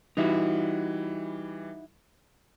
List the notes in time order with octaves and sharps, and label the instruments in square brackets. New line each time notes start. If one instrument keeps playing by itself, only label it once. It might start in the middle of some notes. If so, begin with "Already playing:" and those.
[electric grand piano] E3 G3 [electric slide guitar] D#4 E4 F#4